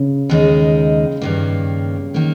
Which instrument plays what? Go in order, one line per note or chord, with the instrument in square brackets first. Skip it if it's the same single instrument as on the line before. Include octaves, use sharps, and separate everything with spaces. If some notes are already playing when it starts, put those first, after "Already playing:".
Already playing: [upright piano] C#3
[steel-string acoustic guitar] D#2 D#3 G#3 D#4
G2 D#3 A#3
D#3 A#3